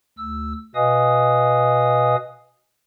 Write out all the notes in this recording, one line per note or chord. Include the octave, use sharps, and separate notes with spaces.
D2 E6
B2 B4 D#5 F5 G#5 D#6